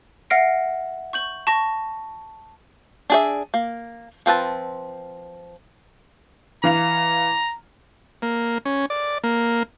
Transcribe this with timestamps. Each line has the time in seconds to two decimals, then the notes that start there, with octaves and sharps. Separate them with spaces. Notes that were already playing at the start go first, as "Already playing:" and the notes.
0.30 E5 F#5 F6 A#6 C7 D7
1.13 C#6 G6 F#7
1.47 A5 C#6 A#6
3.10 D4 G#4 E5
3.54 A#3
4.26 F3 C4 B4 A5
6.64 E3 F5 A#5 F7
8.22 A#3
8.65 C#4
8.90 D5
9.24 A#3